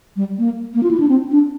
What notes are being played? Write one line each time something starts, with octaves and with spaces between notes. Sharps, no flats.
G3
A#3
A#3
F4
E4
D4
C4
D4